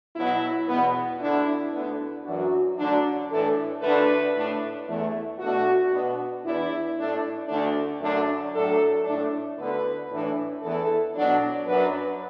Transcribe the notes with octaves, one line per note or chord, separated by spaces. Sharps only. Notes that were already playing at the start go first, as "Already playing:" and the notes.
B2 F#3 B3 E4
E2 B2 B3
D2 D3 A3 D4 E4
D2 D3 B3 D4
F#2 E3 D4 F#4
D2 D3 F#3 D4
A2 E3 D4 A4
D2 D3 A3 D4 B4
A2 A3 D4
E2 E3 A3
B2 A3 D4 F#4
B2 B3 D4
E2 E3 D4 E4
A2 A3 D4
D2 D3 A3 D4
F#2 D3 A3 D4
A2 F#3 A3 D4 A4
A2 A3 D4
D2 D3 B3 D4 B4
A2 E3 D4
E2 E3 B3 A4
B2 F#3 D4
F#2 F#3 D4 B4